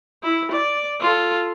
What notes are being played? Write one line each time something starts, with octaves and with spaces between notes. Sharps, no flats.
E4
D5
F4 A4